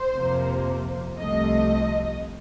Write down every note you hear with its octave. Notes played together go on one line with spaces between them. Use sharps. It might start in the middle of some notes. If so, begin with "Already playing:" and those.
Already playing: C5
F2 C3 F3 A#3
C2 C3 F3 A3 D#5